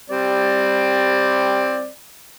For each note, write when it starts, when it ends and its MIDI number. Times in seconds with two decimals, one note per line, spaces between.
0.10 1.88 55
0.10 1.88 60
0.10 1.88 74